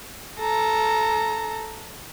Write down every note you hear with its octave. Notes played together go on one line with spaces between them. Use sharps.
A4 A#5